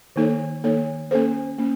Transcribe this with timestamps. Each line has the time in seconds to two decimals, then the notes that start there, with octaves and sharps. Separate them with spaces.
0.16 D#3 A#3 D#4 A4 C#5
0.64 D#3 A#3 D#4 A4 C#5
1.11 A#3 C#4 A4 C5
1.58 A#3 C#4